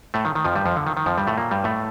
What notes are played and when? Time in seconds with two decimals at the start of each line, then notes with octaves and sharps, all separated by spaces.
0.14 A2 A3
0.25 D#3
0.35 D#3
0.45 F2 F3
0.55 G2 G3
0.66 F2 F3
0.76 D3
0.87 D#3
0.97 D#3
1.06 F2 F3
1.18 G2 G3
1.27 A2 A3
1.38 A#2 A#3
1.51 G2 G3
1.64 A2 A3